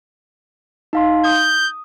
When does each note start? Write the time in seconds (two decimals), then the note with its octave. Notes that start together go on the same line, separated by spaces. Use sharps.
0.93 D#4 F5 C6
1.25 D#6 G6